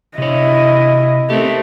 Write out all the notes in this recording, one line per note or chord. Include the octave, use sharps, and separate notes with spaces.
C3 E4 C#5 D#5
A3 C4 G4 A#4